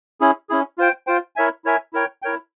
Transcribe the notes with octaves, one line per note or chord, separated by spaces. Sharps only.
C#4 E4 G#4
C#4 E4 G#4
F4 C5 G5
F4 C5 G5
E4 A#4 C#5 E5 G#5
E4 A#4 C#5 E5 G#5
E4 A#4 C#5 G5
E4 A#4 C#5 G5